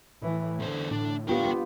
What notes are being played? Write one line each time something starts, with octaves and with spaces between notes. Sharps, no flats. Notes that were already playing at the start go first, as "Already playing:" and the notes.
A2 E3
E2 D3 C5
A2 D4
B3 D4 F4 G4 A#4 G5